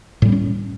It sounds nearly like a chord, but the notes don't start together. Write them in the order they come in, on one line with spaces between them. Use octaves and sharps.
A2 G3 B3 C#4